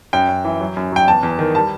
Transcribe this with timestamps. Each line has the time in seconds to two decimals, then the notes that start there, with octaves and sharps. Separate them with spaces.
0.13 F#2 G5
0.28 F#2
0.44 E3
0.61 F#3
0.77 F#2
0.92 F#3 G5
1.08 E2 A5
1.23 E2
1.39 D#3
1.55 G3 A5